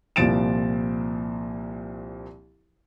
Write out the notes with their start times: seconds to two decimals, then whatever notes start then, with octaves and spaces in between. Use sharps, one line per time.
0.16 C2 A#2 F3 A6 D7 E7